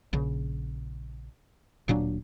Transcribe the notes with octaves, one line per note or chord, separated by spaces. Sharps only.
A#1 C#3
D1 A#2 F#3 D4